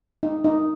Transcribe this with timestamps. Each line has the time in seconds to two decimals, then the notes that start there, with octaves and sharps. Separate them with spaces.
0.23 D#4
0.44 D#4